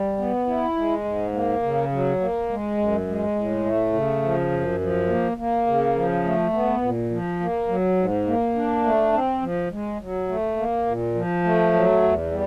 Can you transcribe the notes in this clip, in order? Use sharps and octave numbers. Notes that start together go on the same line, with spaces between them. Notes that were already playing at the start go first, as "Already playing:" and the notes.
Already playing: G3
B3
E4
G#3
G#2
A#3
C#3
F#3
A#3
G#3
F#2
G#3
A2
A3
C#3
F3
F#2
F3
A#3
A#3
C#3
F3
A3
B3
A#2
F3
A#3
F#3
G#2
A#3
D4
A3
C4
F3
G#3
F#3
A3
A#3
A#2
F3
A3
F#3
E2
G3